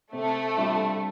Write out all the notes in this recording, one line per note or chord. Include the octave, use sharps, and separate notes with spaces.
C3 A3
G3 D4 F4